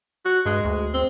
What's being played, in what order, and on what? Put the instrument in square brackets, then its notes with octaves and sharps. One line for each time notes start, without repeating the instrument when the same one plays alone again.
[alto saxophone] F#4
[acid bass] G2 [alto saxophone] G#3
[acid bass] D2
[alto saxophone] C4